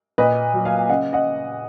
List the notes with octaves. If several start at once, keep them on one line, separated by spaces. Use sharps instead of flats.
A#2 B4 D#5
F#3
F5 G#5
C#3 D#5 F#5
D#5 F#5